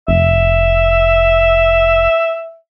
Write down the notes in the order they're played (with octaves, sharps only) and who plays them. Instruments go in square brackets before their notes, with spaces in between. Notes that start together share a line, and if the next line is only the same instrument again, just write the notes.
[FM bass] F1 [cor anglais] E5